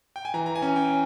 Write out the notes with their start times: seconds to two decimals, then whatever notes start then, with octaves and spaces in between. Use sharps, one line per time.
0.16 G5
0.25 G#5
0.34 E3 A#5
0.46 A#5
0.56 G#5
0.62 C#4
0.76 G5